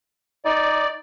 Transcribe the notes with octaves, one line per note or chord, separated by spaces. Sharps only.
D#4 D5